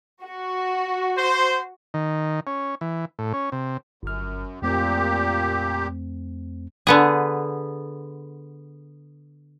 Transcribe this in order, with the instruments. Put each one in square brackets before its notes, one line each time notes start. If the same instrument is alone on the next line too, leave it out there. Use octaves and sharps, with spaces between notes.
[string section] F#4
[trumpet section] C5
[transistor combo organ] D#3
C#4
E3
A2
C#4
C3
[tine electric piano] G1 F6 [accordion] F#2
[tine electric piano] F2 A3 C4 [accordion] A#2 G4
[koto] D3 B3 G#4